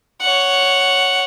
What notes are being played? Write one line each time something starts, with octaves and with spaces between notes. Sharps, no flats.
C#5 F#5